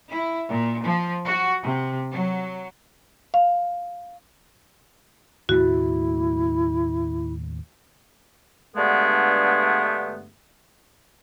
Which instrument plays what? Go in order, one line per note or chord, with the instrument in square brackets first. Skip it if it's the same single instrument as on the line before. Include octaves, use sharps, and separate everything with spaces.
[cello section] E4
A#2
F3
F#4
C3
F#3
[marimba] F5
[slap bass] D#2 A2 A3 [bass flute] E4 [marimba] F#4
[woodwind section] G2 D3 G#3 A3 B3